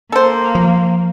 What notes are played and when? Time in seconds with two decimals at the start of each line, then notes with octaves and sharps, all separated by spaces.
0.12 A#3 A4 C5
0.55 F3